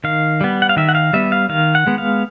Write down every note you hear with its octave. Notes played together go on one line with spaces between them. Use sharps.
D#3 F5
G3 B3
F#5
F5
D#3 E5
F#5
F5
G3 B3 E5
F5
D#3 F5
F#5
G#3 B3
F5